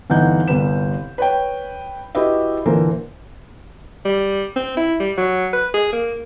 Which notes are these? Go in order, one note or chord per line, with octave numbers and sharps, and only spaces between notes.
G1 E3 C4 D#4 F#5 G6
G1 C2 B4 E7
B4 C#5 G5
E4 F#4 G4 B4 D#5 E5
A#2 D3 E3 A#4 C5
G3
C4
E4
G3
F#3
B4
G#4
A#3